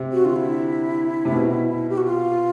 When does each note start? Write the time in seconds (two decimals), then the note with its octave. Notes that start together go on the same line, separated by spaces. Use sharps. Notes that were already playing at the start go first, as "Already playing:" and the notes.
Already playing: C3
0.12 F#4
0.24 D3 F4
0.36 E4
1.25 C3
1.33 B2
1.90 G4
1.97 F#4
2.05 F4